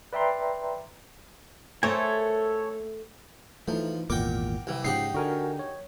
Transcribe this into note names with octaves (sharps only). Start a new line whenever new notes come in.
B4 D5 E5 G5 A#5 C6
A3 A4 A#4 C5 C#5 G#5
E3 F3 A3 D#4
G#1 E2 A#2 A#4 F#5 G5 D6
C2 E3
G#2 C#3 F3 D#4 G4 F#5 C7
D3 F#4 A#4 G#5
C#5